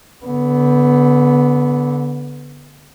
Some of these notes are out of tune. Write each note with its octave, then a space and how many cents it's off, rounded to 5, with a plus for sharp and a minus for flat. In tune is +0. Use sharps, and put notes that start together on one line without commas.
D3 -25 B3 +0